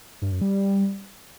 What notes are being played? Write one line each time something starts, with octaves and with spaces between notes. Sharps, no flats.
G2
F#2
G3